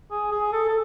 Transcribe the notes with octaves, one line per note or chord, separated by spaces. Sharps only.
G#4
G#4
A4
A4